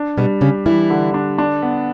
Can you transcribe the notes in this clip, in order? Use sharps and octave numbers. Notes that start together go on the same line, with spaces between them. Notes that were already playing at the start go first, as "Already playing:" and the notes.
Already playing: D4
B2 G3 B3
C#3 C#4 G4
E3 G3 E4
D3
D4
D4
B3